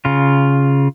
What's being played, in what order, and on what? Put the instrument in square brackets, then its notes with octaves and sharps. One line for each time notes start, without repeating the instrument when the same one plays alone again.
[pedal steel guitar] C#3 F4